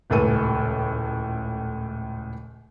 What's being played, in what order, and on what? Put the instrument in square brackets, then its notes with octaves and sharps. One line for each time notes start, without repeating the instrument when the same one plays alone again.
[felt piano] D#1 C#2 A2 A4 D#7